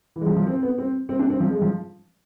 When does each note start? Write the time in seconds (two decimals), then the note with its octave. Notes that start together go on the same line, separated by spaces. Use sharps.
0.16 E3
0.21 G#3
0.26 F3
0.36 F3
0.47 C4
0.63 B3
0.78 C4
1.09 C4
1.19 D4
1.30 C4
1.40 F3
1.50 G#3
1.62 F3